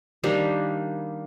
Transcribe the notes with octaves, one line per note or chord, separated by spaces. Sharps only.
D#3 G3 A#3 D4